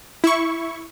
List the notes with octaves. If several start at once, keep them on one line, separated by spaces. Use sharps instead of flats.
E4 C#6